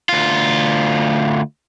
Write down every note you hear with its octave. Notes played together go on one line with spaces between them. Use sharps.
D2 F4